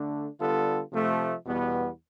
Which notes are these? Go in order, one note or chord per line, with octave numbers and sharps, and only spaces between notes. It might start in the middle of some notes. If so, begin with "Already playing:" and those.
Already playing: D3 A3 D4
D3 G3 B3 F4 A4
C3 F3 A3
E2 B2 G3 B3